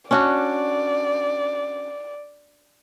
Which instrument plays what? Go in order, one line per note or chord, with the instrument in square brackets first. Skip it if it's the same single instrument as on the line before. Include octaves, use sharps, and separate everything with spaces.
[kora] C#4 D4 F#4 [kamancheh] D5